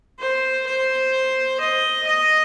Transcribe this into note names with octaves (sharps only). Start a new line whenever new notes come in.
C5
C5
D#5
D#5